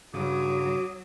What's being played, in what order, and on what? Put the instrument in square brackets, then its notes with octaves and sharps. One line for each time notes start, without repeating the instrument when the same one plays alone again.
[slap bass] G2 C#3 [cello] F#3 [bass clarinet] F#4 [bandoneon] D6 D#6